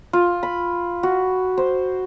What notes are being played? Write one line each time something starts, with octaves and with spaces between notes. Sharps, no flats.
F4
B5
F#4
C5